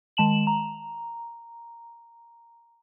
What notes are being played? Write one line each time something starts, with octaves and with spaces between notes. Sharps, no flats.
D#3 G#3 A5 E7 F#7
A#5